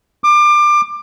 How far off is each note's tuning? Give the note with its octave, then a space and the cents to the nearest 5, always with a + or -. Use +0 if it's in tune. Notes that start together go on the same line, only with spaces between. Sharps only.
D6 +25